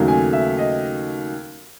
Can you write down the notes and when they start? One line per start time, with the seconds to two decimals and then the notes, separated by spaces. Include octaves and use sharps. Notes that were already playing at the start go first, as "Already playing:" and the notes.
Already playing: D#2 C#3 F#3 A3
0.08 G#5
0.33 E5
0.58 D#5